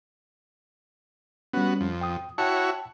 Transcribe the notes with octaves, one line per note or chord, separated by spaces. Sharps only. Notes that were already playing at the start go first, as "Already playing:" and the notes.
G3 B3 C#4 F#4
F2
G5 D#6
E4 F#4 C#5 G5 A5